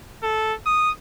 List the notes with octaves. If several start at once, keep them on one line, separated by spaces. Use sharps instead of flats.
A4
D#6